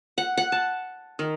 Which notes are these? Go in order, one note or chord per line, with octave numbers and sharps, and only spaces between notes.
F#5
F#5
A5
D#3